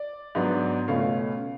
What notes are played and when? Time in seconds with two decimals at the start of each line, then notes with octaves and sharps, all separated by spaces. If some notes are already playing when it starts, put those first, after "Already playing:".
Already playing: D5
0.35 G#2 F#3 B3 D4
0.88 C#2 B2 A3 C#4 F5